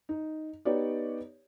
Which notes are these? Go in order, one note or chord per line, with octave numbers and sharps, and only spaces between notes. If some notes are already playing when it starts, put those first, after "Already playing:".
D#4
B3 D#4 G4 C#5 D5